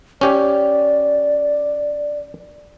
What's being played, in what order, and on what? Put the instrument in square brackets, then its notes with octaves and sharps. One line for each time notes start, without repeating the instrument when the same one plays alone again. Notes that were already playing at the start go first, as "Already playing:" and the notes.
[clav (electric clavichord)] C#4 G4 C#5 [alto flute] D5